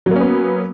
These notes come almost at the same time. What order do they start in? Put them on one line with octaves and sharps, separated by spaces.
F#3 A#3 C#4 B3